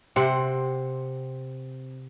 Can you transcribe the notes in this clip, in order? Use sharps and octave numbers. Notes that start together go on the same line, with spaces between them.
C3 C4 F#5